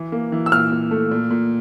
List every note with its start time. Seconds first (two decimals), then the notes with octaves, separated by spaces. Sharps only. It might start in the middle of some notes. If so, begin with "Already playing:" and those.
Already playing: E3
0.12 A#3
0.32 E3
0.46 E6
0.52 A#2 F6
0.71 A#2
0.91 A3
1.11 A#2
1.30 A#2